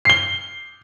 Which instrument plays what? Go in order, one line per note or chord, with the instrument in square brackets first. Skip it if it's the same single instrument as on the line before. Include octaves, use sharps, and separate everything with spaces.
[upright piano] C7 G7